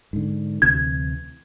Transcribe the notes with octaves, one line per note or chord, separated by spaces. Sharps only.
G#2 D3
D2 C3 E3 G#6